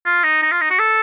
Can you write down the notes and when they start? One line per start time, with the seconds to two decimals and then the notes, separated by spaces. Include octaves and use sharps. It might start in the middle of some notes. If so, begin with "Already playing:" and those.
0.05 F4
0.24 D#4
0.42 D#4
0.51 F4
0.61 D#4
0.70 F#4
0.79 A4